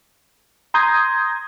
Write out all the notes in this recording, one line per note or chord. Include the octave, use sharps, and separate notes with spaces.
A#5 C6 D#6 G6 G#6 A#6